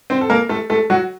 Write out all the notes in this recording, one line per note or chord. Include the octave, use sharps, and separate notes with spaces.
C4 C5
A4
A#3 A#4
A3 A4
A3 A4
F#3 F#4